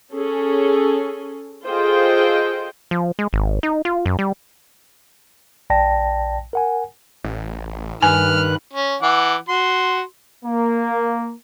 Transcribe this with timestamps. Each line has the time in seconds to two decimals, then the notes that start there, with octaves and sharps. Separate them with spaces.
0.11 C#4 G#4 A4
1.66 F4 G#4 A4 C5 D#5 G5
2.91 F3
3.19 G#3
3.33 G#1
3.63 D#4
3.85 F4
4.06 F#2
4.19 G3
5.70 A#1 D5 G5 A5 A#6
6.53 A#4 F#5 G#5
7.24 A1
8.02 G2 D#3 B4 G#5 F6 F#6
8.73 C#4
9.02 E3 F#5 D6
9.49 F#4 C6
10.45 A#3